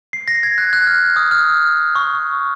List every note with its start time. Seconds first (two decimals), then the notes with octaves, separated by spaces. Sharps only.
0.13 C7
0.28 A#6
0.43 G#6
0.58 F#6
0.73 F#6
0.87 F6
1.16 D#6
1.31 F6
1.95 C#6